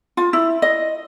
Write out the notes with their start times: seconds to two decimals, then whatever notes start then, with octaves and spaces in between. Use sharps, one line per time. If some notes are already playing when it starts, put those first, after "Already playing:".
0.17 F4
0.33 E4
0.62 D#5